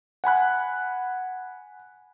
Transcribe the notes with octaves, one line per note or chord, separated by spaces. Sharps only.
F#5 G#5 B5 F#6